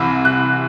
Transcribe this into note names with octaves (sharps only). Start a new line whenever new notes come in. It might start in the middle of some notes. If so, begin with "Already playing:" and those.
Already playing: C2 C3 E3 E6
F#6